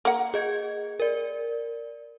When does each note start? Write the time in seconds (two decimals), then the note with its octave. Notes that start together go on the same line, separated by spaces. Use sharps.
0.05 A#3 F#5
0.34 G#4 D#5 G#6
1.00 A#4 D5